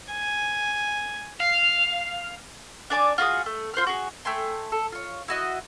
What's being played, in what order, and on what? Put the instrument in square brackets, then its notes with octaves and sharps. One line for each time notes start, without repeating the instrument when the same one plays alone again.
[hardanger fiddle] G#5
[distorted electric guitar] F5
[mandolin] D4 D5 G#5 D6
F4 F#4 G#4 D#6
A3
F4 C5 F#5 F6
F#4 G#4
A3 G5 G#5 C6
A4
F4 C#5
E4 F#4 D#5